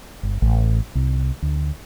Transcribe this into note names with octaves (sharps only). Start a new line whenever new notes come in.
G1
A1
C2
D2